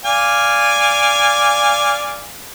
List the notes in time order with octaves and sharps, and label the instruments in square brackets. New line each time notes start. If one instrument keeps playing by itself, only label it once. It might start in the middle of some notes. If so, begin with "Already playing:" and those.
[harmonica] D5 F5 G#5